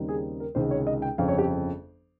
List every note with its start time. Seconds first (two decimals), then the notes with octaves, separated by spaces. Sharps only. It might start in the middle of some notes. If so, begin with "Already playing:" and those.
Already playing: D#2 C#3 G3 C4 D#4
0.09 G#4
0.40 A#4
0.55 C#2 C3 D#3 G#3 D#4 C5
0.71 C#5
0.87 D#5
1.02 G5
1.18 G1 F2 C#3 F3 C4 F5
1.28 C#5
1.39 G4